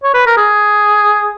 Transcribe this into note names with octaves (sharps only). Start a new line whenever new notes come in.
C#5
B4
A#4
G#4